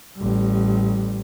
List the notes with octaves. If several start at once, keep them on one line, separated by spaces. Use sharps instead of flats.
A1 G3